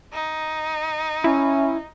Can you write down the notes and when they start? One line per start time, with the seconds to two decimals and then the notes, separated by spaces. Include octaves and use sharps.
0.13 D#4
1.24 C#4 E4